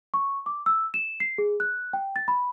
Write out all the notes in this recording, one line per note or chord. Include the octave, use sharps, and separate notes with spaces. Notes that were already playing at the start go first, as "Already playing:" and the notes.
C#6
D6
E6
E7
C7
G#4
F#6
G5
A6
B5